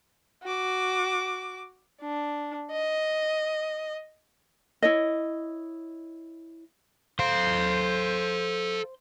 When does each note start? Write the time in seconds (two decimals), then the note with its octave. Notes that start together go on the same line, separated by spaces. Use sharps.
0.43 F#4 D6
2.02 D4
2.72 D#5
4.82 E4 C#5 D#5
7.19 A4 C5 F5